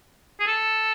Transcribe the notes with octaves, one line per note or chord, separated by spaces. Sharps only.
G#4
A4